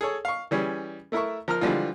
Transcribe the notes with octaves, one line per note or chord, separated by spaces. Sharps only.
G#4 A4 C#5
F5 C#6
E3 G3 C#4 G#4
A3 E4 A#4 E5 C#6
F3 A#4 A#5 F6
D3 E3 F3 G3 G#3 F4